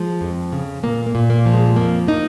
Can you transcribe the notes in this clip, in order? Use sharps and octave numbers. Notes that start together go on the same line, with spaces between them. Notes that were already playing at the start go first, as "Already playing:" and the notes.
Already playing: F3 G#3
F2
C#3
A#2 A#3
A#3
A#2
A#3
F3
G#3
F2 A#3
A#3 D#4